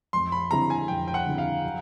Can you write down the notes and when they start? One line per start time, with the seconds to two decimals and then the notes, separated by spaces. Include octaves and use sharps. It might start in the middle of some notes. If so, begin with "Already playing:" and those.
0.13 F2 C6
0.32 B5
0.51 D3 G3 C4 E4 A#5
0.70 G#5
0.88 F2 G5
1.08 G5
1.14 F#5
1.26 D3 G3 C4 E4
1.38 F5
1.63 F#3